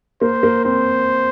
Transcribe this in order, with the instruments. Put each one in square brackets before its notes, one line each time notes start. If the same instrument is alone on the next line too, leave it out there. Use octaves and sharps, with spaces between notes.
[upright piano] A#3 [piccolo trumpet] C5
[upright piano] A#3
[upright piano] C4 [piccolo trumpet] C5